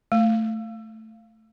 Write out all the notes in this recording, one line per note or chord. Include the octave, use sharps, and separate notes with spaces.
A3